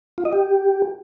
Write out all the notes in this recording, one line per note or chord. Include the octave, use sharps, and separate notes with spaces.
F4
D#5
G4